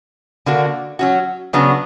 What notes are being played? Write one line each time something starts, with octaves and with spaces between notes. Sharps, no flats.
D3 A#3 D4 F#4
F#3 C#4 F#4
C#3 F#3 B3 D4 F#4